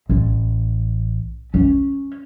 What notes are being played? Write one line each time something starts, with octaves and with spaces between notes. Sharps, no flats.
A1
C#4